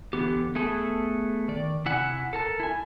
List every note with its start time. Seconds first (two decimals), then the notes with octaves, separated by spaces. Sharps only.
0.13 E2 D3 B3 G4
0.55 A3 B3 G#4 A4
1.48 D#3 D5
1.85 C3 E4 F#5 G#5
2.33 A4 A#4 A5
2.60 E4 G#5